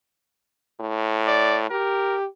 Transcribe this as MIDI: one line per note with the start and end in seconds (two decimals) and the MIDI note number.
0.80 1.70 45
1.27 1.59 74
1.70 2.26 67
1.70 2.16 70